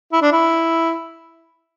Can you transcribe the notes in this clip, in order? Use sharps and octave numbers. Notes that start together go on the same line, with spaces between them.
E4
D4
E4